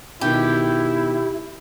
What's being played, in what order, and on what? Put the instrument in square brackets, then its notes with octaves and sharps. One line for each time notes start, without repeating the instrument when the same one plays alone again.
[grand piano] B2 D#3 [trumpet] E4 [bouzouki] G4